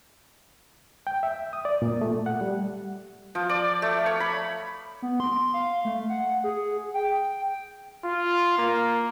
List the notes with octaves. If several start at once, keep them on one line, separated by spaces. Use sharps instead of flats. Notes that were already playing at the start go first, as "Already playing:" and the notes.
G5
E5
D#6
D5
A#2
A3
F#5
G3
F3
D5
A3
C#5
B5
B3
C6
F5
A3
F#5
G#4
G5
F4
A#3